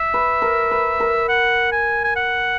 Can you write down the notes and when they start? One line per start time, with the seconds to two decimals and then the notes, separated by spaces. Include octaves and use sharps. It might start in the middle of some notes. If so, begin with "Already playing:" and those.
Already playing: E5
0.14 B4
0.42 A#4
0.71 B4
1.00 A#4
1.28 F#5
1.72 G#5
2.04 G#5
2.16 F#5